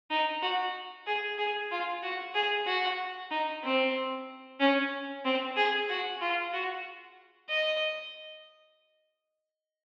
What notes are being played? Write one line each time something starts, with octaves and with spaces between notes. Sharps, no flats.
D#4
F#4
G#4
G#4
F4
F#4
G#4
F#4
D#4
C4
C#4
C4
G#4
F#4
F4
F#4
D#5